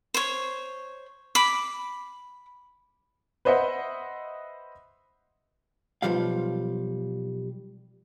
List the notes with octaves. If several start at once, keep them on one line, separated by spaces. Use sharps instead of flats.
C5 C#5
B5 D6
B4 C5 D#5 E5 F#5
B1 G#2 F3 G3 F5